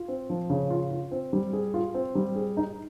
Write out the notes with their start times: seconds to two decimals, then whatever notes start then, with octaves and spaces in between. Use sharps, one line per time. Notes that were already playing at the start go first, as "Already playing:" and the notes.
Already playing: F4
0.08 C4
0.30 F3
0.50 C#3
0.70 F4
0.91 F4
1.12 C4
1.33 G3
1.53 G#4
1.74 F4
1.94 C4
2.15 G3
2.36 G#4
2.57 D#4